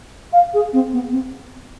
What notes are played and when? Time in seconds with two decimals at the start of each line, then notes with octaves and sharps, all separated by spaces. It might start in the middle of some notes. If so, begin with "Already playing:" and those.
0.33 F5
0.54 G#4
0.73 C4
0.93 B3
1.12 C4